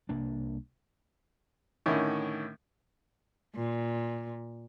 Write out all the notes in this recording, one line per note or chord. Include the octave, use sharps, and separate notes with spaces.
C2 A#3 D4
A2 D3 D#3 C#4 E4
A#2